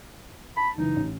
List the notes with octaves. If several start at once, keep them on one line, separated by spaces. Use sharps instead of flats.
A5 B5
F#1 E3 D#4
A1